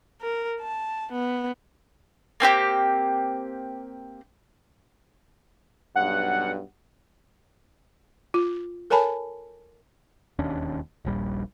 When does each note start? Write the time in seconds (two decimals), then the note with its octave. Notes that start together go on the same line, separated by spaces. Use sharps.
0.21 A#4
0.61 A5
1.12 B3
2.40 A#3 C4 F4 G4
5.96 B1 G2 F#5
8.34 F4
8.90 A4 A#4 C#5 G#5 A5 B5
10.39 E1 D#2 C#4 D4
11.05 D#1 A#1 G3